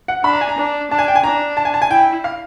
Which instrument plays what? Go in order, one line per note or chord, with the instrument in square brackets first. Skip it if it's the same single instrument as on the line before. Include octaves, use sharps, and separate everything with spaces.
[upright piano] F#5
[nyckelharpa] D4 [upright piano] B5
[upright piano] A#5
G#5
A#5
[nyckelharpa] D4
[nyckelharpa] D4 [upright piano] A5
[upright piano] G#5
G5
G#5
[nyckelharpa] D4 [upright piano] A#5
[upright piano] A5
G#5
A5
G#5
[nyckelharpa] E4 [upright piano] G5
[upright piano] F5